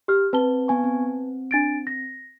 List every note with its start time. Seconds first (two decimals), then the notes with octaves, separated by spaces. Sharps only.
0.08 G4 F6
0.33 C4 B4 A5 G7
0.68 B3 G#5 C#6
0.84 C4
1.51 D4 A6 D7
1.87 A#6